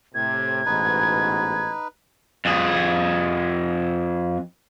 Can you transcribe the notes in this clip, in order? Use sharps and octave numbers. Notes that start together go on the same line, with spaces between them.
A2 C3 G#6
A1 G#2 B2 D#4 B4
F2 G#4